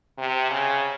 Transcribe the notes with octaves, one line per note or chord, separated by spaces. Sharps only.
C3
C#3